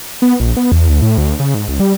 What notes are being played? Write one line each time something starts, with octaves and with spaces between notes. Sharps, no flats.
B3
A#1
B3
E2
D2
A2
D2
C#3
G#2
C#2
G3